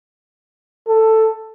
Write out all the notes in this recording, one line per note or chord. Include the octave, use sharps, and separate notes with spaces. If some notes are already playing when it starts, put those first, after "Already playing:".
A4